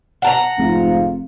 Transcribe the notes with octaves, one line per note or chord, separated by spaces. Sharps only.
F#5 A5 A#5
F1 G#2 F4